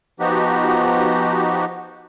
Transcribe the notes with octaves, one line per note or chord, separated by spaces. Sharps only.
F3 B3 D#4 F#4 G4